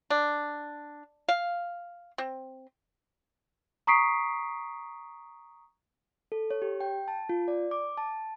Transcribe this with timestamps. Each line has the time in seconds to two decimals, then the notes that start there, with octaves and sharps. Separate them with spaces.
0.10 D4
1.28 F5
2.18 C4
3.87 A#5 C#6 D#6 B6 C7 D7
6.32 A4
6.51 C#5
6.62 G4
6.80 G5
7.08 A5
7.29 F4
7.48 D5
7.71 D6
7.98 A5